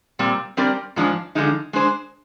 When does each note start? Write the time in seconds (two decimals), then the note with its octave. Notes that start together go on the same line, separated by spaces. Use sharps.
0.19 A#2 G3 C4
0.57 G3 C4 G4 A#4 D5
0.96 G#2 F3 G#3 D4 G#4
1.35 D3 F3 G#3 D#4
1.73 G#3 D4 G#4 C5